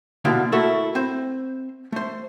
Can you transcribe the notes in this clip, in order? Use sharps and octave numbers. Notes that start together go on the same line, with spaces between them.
B2 D3 G3 A#3 E4 G5
A3 E4 F#4 A4 A#4 E5
C4 C5
A3 C5